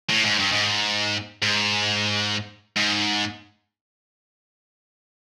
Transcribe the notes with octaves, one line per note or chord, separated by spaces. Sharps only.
A2
G#2
G2
G#2
G#2
G#2